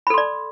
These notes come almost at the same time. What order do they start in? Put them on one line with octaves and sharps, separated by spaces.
B5 A4 C6 D5